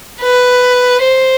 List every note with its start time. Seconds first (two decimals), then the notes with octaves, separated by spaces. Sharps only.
0.21 B4
1.01 C5